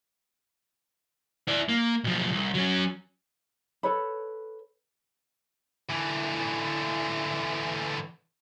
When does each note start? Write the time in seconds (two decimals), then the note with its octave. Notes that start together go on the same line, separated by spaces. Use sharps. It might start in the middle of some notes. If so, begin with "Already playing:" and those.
1.48 E4 D5
1.69 A#3
2.04 B1 F3
2.31 C2
2.55 F#3 C#4
3.83 A4 B4 C#5 B5
5.90 D3 E3